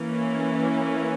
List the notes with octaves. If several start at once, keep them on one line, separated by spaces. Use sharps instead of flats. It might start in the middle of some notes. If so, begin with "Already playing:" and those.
Already playing: E3 A#3 C#4